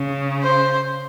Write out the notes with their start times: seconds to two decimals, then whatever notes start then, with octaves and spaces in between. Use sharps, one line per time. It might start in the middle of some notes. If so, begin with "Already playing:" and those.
Already playing: C#3
0.43 C5